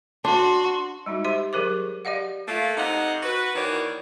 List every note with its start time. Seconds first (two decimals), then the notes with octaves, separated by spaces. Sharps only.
0.25 D4 F#4 C6
1.06 G3 G#3 D#4 F#4
1.24 G4 C5 E5 C6
1.53 F#3 G4 G#4 A#4 C5 D6
2.05 G4 D5 D#5 F5 F#5
2.48 A3 A#3 F4
2.77 C3 D#4 A4 C5 D#5 F#5
3.23 F#4 B4
3.56 D#3 E3 A#3 F#4 C#5 D5